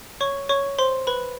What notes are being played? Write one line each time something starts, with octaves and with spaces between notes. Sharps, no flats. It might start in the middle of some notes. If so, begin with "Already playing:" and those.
C#5 C#6
C#5 C#6
C5 C6
B4 B5